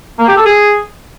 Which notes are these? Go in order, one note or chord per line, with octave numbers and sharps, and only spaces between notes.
A#3
G4
A4
G#4